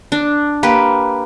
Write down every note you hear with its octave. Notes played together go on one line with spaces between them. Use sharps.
D4
A#3 G4 B4